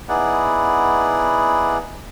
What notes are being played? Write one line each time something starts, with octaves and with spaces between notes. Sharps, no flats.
B3 D#4 E4 G#4 D5 F#5